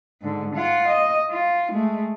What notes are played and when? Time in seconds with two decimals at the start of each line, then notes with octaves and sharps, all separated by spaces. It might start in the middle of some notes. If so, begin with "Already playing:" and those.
0.22 G#2 D3
0.56 F4 F#5
0.88 D#5
1.31 F4
1.72 G#3 A3